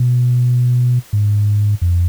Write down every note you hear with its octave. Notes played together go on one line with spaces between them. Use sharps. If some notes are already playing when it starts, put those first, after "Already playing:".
Already playing: B2
G#2
F2